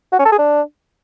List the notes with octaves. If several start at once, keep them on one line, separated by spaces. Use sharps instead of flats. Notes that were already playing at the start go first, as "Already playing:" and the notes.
F#4
C#4
A4
G#4
D4